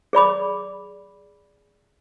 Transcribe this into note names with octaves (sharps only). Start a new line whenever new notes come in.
G#4 D5 B5 D6